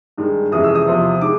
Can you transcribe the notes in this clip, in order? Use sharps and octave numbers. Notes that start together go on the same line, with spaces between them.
G2 D#3 G#3
F2 C3 E3 G#3 C#4 D#6
E6
D#6
E2 C3 F3
D#3 G#3 D6